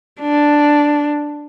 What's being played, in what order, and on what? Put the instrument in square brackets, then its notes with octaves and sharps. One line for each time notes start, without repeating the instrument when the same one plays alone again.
[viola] D4